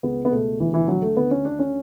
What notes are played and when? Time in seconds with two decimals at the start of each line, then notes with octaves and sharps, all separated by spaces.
0.03 C#2 B3
0.25 B3
0.32 B2 A3
0.60 D2 E3
0.74 E3
0.88 D3 F#3
1.02 A3
1.16 D2 B3
1.31 C#4
1.45 D3 D4
1.59 C#4